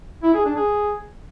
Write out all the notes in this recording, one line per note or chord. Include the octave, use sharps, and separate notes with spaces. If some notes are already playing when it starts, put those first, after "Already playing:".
E4
G#4
D4
G#4